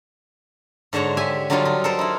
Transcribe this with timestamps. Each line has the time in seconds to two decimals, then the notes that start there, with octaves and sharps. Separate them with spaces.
0.93 G#2 D3 C5 C#5 A#5
1.17 G4 E5 G#5
1.50 D3 F#3 G3 D#4 F4
1.65 D#4
1.84 A4 A#4 C5
1.99 D#4 E4